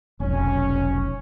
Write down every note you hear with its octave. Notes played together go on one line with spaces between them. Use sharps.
F1 B1 C#4